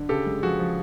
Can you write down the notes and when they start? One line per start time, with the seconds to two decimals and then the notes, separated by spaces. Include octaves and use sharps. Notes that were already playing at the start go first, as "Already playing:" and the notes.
Already playing: D3
0.09 C#3 G4 A4
0.26 G#3
0.43 F3 F#4 G#4
0.59 F3